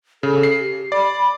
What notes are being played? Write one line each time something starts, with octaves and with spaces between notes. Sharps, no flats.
C#3 A4
C7
G4
D5 B5